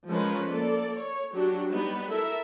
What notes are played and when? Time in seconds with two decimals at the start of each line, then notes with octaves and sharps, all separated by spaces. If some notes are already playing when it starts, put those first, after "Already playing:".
0.10 F3 G#3 C#4 A#4 B4
0.49 A#3 A4 D5
0.98 C#5
1.35 F#3 D4 F#4 G4
1.70 G3 B3 D#4 B4
2.10 E4 A4 A#4 E5